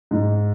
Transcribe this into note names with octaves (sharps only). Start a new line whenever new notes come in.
G#2